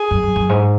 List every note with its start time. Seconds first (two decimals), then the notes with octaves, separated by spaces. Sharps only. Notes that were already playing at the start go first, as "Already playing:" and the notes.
Already playing: G#4
0.11 F#2
0.23 F#2
0.36 F#2
0.49 G#2